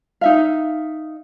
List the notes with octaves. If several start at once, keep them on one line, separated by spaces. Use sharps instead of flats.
D#4 E5 F5